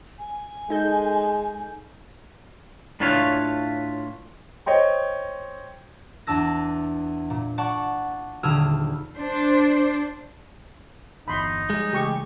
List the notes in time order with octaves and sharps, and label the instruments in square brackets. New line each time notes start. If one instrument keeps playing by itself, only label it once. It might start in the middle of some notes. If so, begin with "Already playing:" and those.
[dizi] G#5
[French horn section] G#3 [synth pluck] D#4 A4 G6
[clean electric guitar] A2 D4 F4 B4 C#5 F5
[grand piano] C5 C#5 D#5 G5 C6
[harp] E2 D4 A5 E6 A#6
A#2
D5 F#5 A5 C#6
D#1 D3 G#4 E6 F6
[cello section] D4 C5
[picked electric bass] G1 E2 [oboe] D#4 [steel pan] B5 C6
[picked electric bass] F3 G3 [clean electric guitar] G#3
[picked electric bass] C#3 E3 A3 [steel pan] G4 C#6